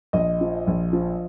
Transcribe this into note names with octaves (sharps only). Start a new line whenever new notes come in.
A#1 D#5
F3
A#1
F3